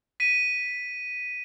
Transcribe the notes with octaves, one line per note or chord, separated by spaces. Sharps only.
B6 D#7